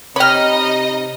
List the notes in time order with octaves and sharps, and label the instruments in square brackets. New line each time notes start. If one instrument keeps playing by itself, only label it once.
[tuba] C3 [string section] D#4 D#5 [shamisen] C#5 G5 [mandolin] B5 F6